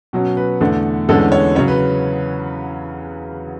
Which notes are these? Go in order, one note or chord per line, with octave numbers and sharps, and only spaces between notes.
B2 F#3 C#4
B4
E2 D3 A3
E2 D3 G#3 C#4 A4
C#5
C#3 F#3 C#4 C#5
B4